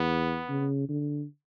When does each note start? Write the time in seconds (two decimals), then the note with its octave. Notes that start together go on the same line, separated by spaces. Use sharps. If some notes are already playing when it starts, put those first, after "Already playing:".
Already playing: E2 B3
0.49 C#3
0.89 D3